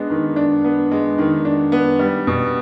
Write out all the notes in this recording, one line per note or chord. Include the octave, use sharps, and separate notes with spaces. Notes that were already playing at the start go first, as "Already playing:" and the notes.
Already playing: G#3 B3 D4
D#3
D4
B3
G#3
D#3
D4
B3
G3
B2